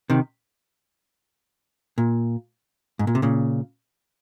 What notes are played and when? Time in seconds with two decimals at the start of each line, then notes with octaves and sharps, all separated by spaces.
0.10 C3 D#3
1.98 A#2
2.99 G#2
3.07 A#2
3.15 C3
3.22 A#2 C#3